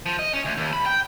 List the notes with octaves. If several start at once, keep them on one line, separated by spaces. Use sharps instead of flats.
F3
D#5
C#4
D2
D#2
B5
G5